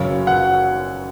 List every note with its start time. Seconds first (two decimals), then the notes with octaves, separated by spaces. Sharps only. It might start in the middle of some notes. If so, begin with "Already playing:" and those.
Already playing: F#1 F#2 C#3 F#3 C#5
0.27 F#5